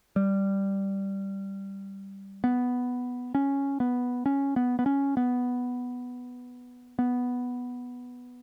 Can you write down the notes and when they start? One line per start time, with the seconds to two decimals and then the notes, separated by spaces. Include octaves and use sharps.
0.16 G3
2.44 B3
3.35 C#4
3.80 B3
4.26 C#4
4.56 B3
4.79 B3
4.86 C#4
5.17 B3
6.99 B3